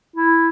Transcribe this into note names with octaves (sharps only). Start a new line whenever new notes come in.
E4